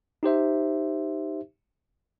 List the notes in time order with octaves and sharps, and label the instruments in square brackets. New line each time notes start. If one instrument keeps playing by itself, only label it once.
[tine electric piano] D#4 G4 C5 E5